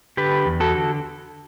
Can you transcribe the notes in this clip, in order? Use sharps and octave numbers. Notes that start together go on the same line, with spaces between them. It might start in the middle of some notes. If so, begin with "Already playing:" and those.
D3 G4 B4
E2
F#4 A4
D3